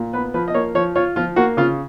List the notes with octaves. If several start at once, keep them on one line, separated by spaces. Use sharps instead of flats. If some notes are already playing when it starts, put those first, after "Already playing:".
Already playing: A#2
B3 B4
F3 B4
D#5
A#3 C#5
F3 C#5
F4 C#5
F3 F4
A#3 F#4
C#3 F4